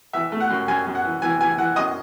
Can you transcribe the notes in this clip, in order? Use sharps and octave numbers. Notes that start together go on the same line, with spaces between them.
E3 E5
A3
F#5
F#2
F#2 G#5
F#2
F#5
E3
E3 G#5
E3 G#5
E3 F#5
F#2 D#5